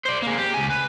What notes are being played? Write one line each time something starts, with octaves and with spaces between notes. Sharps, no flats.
C5 D5
G#3 A#3
G4
C#2 G#5
B4